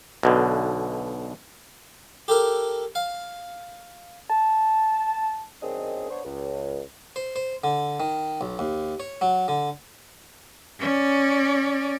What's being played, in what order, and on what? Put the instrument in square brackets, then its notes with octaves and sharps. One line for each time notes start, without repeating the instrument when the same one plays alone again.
[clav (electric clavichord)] B1 B2 D3
[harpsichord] G4 A4 A#4
F5
[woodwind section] A5
F#2 D#3 C4 D4 G#4 D#5
B3 D4 C5 C#5
C#2
[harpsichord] C5
C5
D3
D#3
B1
D#2
C#5
F#3
D3
[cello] C#4 D5